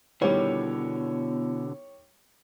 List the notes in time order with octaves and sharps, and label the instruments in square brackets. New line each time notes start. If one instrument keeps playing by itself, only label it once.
[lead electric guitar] B2 D3 [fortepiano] D#3 G3 [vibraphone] B3 E4 [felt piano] C#5